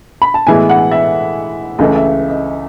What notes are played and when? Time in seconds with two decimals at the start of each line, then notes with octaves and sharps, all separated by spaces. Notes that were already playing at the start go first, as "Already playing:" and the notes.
0.22 B5
0.34 A5
0.47 A2 E3 G#3 B3 E4 G#5
0.69 F#5
0.91 E5
1.79 C#2 C#3 E3 A3 D#5
1.96 E5
2.29 D#5